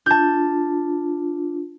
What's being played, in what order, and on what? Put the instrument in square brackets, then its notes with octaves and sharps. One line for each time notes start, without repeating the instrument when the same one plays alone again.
[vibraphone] D4 F4 [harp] A5 G6